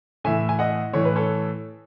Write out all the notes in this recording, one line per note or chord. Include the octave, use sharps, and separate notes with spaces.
A2 E3 E5 G#5
G#5
D#5 F#5
A2 E3 C#5
B4
A4 C#5